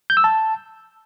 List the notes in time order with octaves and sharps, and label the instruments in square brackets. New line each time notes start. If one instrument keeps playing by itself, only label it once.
[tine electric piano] G6
E6
A5